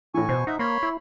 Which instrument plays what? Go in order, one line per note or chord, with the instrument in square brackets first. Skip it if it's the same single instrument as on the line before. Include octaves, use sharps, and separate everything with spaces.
[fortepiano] A2 E3 [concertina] G#5 C#6
[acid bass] B2 [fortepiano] C5
[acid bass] D#4 [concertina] E5 F#5
[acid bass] A#3 [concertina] C#5 B5 C6
[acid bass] E4